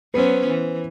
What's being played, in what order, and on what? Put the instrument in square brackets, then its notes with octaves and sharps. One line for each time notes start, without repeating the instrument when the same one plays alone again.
[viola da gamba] F#3 B3 C#4 [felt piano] B4 C5
[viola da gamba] E3